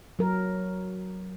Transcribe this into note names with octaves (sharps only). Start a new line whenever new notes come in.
F#3 A#4